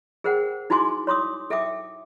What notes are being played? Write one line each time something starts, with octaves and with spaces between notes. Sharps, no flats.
G#4 A#4 C5 F#5 G5
D#4 E4 F#4 G#5 C6 D6
C#5 C6 D6 D#6
A4 E5 G5 D6